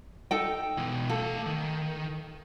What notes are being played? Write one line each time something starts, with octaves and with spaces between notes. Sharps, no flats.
D#4 A4 G5
B2 E3
A3 A4 F5
D#3